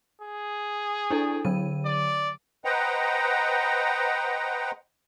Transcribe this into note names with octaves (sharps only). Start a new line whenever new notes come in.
G#4
D4 E4 A4
D3 F#3 D#7
D5
B4 C5 D#5 F#5 G5 A#5